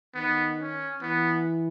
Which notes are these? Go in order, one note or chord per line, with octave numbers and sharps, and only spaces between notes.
D#3 B3
C#4
E3 B3